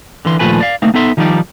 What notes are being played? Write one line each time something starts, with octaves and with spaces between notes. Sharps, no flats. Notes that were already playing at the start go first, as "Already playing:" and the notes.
D3 E3 C6
D#2 A#2 F3 A3 B4 G#5
D5 F5
A3 A#3 C4 D#4
B3 D#4 A4 E5 C6
D#3 F3 G3 D#4 D5